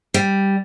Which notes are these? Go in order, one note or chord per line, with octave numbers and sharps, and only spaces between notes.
G3